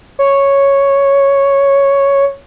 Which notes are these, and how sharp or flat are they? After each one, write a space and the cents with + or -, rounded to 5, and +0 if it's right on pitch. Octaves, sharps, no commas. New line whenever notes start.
C#5 +0